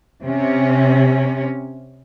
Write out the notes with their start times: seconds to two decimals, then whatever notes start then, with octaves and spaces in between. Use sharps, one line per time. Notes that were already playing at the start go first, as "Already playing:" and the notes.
0.24 C3 C#4